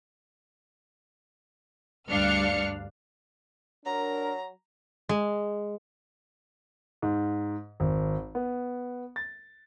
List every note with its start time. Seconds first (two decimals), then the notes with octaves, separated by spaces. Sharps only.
2.08 D2 G2 D4 F5 F6 C#7
3.85 F#3 D4 A#4 A#5
5.09 G#3
7.02 G#2
7.80 G#1
8.35 B3
9.16 A6